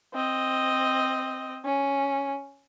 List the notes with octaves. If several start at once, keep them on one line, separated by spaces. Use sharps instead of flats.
C4 D#5
C#4